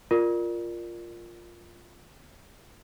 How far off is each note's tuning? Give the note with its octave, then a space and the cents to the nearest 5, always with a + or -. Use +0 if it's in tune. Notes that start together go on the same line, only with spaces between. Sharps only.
F4 +0 A#4 +0 D5 +15